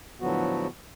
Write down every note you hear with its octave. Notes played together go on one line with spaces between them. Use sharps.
A2 D3 F3 F#3 B3 F#4